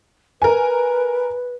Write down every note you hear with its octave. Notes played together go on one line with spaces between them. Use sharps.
A#4 B4 G#5